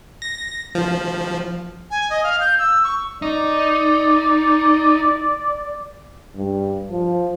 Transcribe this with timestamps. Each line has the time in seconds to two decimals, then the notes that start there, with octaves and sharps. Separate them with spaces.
0.22 A#6
0.75 F3
1.91 G#5
2.10 D#5
2.23 F5
2.40 G6
2.59 E6
2.84 C#6
3.22 D#4 D5
6.35 G2
6.91 F3